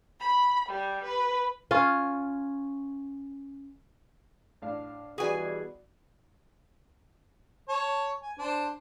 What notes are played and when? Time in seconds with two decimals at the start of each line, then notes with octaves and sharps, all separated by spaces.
0.18 B5
0.68 G3
1.03 B4
1.71 C#4 F4
4.62 A2 D4 F5
5.18 B2 E3 G3 F#4 G#4 B4 D5 G#5
7.69 C#5 A5
8.22 G#5
8.38 D4 C5